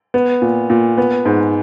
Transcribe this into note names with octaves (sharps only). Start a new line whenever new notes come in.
B3
A#2
A#2
B3
G#2